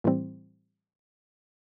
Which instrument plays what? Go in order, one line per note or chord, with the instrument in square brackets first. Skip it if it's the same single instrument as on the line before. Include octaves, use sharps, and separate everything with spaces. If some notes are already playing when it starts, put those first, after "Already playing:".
[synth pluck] A2 E3 G3 C4